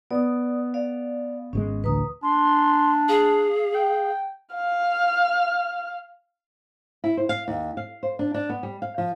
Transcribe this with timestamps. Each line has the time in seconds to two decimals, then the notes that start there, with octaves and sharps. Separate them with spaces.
0.11 B3 D5 D#6
0.74 D5 F5
1.53 G#1 C3 G#3 C#4
1.84 A1 D2 B4 A#5 D#6
2.23 D4 C6
3.08 G#4 F5
3.75 G5
4.55 F5 F6
7.04 E4
7.17 C5
7.29 F5
7.48 D#2
7.77 F5
8.03 C5
8.19 D4
8.34 D4
8.49 B3
8.63 G3
8.82 F5
8.98 F3